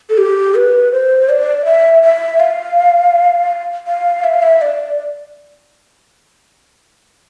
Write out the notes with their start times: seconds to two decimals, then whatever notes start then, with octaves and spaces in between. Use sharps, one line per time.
0.10 A4
0.18 G4
0.55 B4
0.92 C5
1.29 D5
1.65 E5
2.03 E5
2.40 F5
3.87 F5
4.24 E5
4.34 F5
4.43 E5
4.61 D5